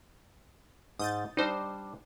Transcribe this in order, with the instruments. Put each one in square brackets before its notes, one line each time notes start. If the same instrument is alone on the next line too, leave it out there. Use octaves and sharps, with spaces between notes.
[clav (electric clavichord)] G#2 [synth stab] D#6 G6 A6
[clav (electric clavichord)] G3 D4 [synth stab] D#4 C5